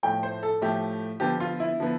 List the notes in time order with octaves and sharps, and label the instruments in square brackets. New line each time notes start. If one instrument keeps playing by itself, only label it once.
[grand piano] A2 F3 A3 G5
C5
A4
A2 F3 A3 G4
D3 F3 B3 G4
F4
E4
D3 F3 B3